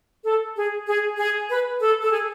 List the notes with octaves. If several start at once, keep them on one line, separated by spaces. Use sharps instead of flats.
A4
G#4
G#4
G#4
B4
A4
A4
G#4